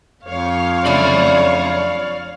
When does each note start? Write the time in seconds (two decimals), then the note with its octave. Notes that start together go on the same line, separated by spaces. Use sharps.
0.26 F2 C#5 F5
0.86 C#3 A3 D4 D5 B5